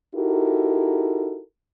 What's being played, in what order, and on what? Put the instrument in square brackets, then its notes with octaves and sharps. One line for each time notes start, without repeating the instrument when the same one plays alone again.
[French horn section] D#4 E4 F#4 G4 A4 A#4